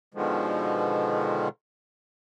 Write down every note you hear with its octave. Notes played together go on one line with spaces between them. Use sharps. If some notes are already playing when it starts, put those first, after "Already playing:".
B2 D3 D#3 F3 G#3